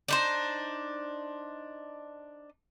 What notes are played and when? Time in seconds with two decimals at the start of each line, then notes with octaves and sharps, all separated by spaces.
0.08 D4 D#4 C5